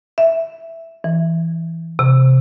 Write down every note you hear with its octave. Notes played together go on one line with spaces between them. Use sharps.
E5
E3
C3